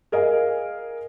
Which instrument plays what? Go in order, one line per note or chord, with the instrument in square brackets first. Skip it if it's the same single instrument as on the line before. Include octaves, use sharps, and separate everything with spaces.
[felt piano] G#4 A#4 D#5 F5 G#5